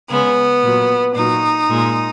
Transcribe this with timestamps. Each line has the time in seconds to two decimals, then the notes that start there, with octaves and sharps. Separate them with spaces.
0.10 C#3 G#3 B3
0.63 A#2 F#3
1.16 A#2 F#3 D#4
1.69 A#2 G#3